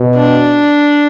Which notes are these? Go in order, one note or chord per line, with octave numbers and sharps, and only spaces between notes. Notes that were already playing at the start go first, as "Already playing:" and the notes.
Already playing: B2
D4